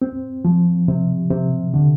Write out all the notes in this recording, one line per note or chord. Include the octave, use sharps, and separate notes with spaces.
C4
F3
C3
C3
D3